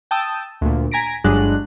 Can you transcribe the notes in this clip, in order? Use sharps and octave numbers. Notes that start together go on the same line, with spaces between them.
G5 A5 D#6 E6
D2 A#2
G#5 A#5 A#6 B6 D7
G1 G2 F#3 G#3 D4 F#6